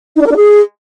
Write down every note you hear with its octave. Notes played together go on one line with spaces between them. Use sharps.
D#4
D4
A#4
D4
G#4